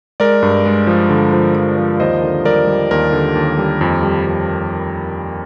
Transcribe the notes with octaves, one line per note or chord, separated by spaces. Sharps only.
G#3 A#4 D5
G2
G#3
F3
D3
F3
F3
F3
D#2 C5 D#5
D3
G3 A#4 D5
G3
D#2 A#4
D3
D#2
G3
F2
G3
F2